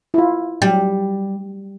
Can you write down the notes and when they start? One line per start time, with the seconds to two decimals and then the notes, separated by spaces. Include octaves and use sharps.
0.14 E4 F4
0.62 F#3 G3